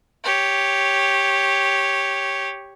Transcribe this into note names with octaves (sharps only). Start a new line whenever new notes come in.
G4 C#5